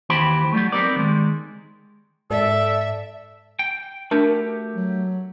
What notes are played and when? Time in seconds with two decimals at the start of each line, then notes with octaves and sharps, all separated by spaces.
0.10 D#2 E3 G4 C5 B5
0.52 F#3 G3 A3
0.72 G3 B3 C4 D#4 A#4 D5
0.96 D#3 G#3
2.31 G#2 A4 D5 E5
3.59 G5
4.11 A3 D4 F#4 G4 A#4
4.76 F#3